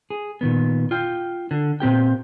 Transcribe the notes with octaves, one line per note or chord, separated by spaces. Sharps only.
G#4
A#2 D#3 B3
F4 G5
D3
A#2 C4 G4 G5